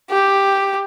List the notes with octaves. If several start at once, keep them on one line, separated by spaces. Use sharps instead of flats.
G4